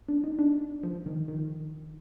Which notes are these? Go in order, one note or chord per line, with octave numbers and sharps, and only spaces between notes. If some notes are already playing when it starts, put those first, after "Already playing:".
D4
D#4
D4
F3
D#3
D#3